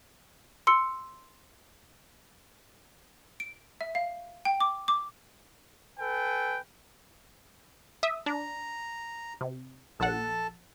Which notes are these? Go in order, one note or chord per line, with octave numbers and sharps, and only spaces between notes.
C6 E6 C#7
D7
E5
F5
G5
D6
D6
A4 B4 G5 G#5
E5 D#6
D4 A#5
C3
A#1 A4 F#5 A5